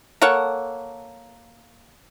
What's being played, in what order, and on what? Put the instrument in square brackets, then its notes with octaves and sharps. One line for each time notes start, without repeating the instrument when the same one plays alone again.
[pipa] A#3 A4 C#5 F#5